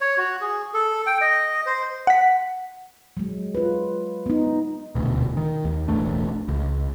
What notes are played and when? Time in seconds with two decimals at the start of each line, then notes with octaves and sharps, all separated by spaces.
0.01 C#5
0.18 F#4
0.41 G#4
0.74 A4
1.07 G5
1.21 D#5
1.66 C5
2.07 F#5 B6
3.17 F#3 G#3
3.55 F4 B4
4.26 B3 D#4
4.95 D#1 D2 B2
5.37 D#3
5.65 D#2
5.88 E1 A1 A3 D4
6.48 C#2